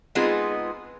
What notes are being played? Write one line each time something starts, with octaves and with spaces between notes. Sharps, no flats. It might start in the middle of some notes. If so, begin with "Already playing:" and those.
G#3 B3 C4 D#4 F4 G#4